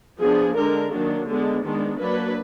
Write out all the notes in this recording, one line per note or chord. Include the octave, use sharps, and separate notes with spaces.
F3 B3 D4 G#4
D3 G#3 D4 A#4
D#3 F#3 A#3 D4
D3 G#3 B3 D4
D#3 G#3 B3 D4
F#3 A#3 D4 B4